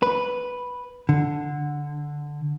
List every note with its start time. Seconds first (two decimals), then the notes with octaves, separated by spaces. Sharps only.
0.03 B4
1.09 D3